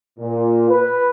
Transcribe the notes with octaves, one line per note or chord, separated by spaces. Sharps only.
A#2
B4